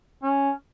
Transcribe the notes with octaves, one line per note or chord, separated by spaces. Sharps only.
C#4